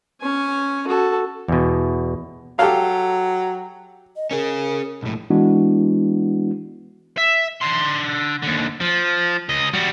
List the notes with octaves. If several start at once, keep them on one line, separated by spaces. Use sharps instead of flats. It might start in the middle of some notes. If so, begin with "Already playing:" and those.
C#4 G#5
F#4 A4
E2 B2
F#3 G4 A4 F5
D#5
C#4 G#4 A#4
B1 A2
E3 G#3 B3 D4 E4 F#4
E5
D3 C6
D#2 D3
F3
C#2 D#5
G3 F#4